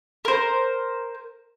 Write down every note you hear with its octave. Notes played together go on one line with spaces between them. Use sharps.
A#4 C5